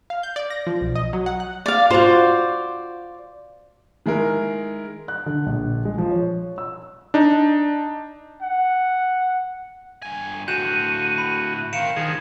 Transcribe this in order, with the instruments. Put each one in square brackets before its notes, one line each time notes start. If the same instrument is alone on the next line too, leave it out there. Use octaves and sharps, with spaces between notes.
[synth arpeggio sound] F5
G6
D5
A#6
F3
B1
D#5
F#3
F#5
F#6
[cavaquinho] D5 F5
[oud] F4 F#4 [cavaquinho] C5 D5
[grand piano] D#3 G#3 E4 A#4
F#6
D3
A#1
G#3
F3
C#5
E6
[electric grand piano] D4 D#4
[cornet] F#5
[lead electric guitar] G2 G#5
[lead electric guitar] A2 D3 [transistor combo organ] F#4 [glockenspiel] G6 E7 [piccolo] D#7
[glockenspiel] B5
[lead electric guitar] D#3 C4 [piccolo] F5 [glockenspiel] C#7 E7
[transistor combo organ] D#3 G#4 [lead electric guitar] F3 D4